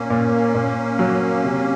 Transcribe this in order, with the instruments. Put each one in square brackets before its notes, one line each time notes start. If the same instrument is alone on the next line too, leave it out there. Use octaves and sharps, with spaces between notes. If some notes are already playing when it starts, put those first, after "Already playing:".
Already playing: [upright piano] A#2 [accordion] A#3 C#4
[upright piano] A#2
A#2
F#3
C3